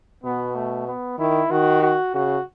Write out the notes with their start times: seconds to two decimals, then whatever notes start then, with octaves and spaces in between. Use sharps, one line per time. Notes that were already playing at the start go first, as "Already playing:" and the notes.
0.24 B2 B3
0.55 A3
0.88 B3
1.19 D#3 E4
1.51 D#3 F#4
1.82 F#4
2.14 C#3 F#4